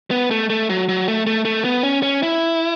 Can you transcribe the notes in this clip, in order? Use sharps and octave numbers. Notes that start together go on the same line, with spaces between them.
B3
A3
A3
F#3
F#3
A3
A3
A3
B3
C#4
C#4
E4